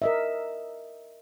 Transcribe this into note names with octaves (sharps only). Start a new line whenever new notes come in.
A#4 D#5 E5